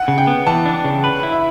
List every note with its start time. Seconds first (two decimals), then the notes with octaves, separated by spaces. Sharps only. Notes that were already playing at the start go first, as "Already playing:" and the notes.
Already playing: F#5
0.08 C#3
0.18 G5
0.27 B3
0.47 E3 A5
0.65 D4
0.85 C#3
1.04 B4 B5
1.23 E4
1.32 E5